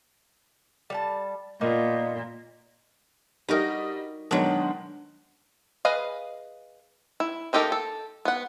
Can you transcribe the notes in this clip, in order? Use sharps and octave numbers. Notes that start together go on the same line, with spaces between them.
G3 F#5 A5
A#2 A#3 B3 D#4
G3 D#4 F#4 A#4 D#5
B2 D#3 F#3 G#3 D4
G#4 B4 D#5 F5
E4
A#3 D#4 G4 A4 A#4
A4
B3 F#5